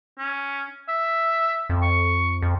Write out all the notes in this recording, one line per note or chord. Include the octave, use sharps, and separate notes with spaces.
C#4
E5
F2
C#6
F2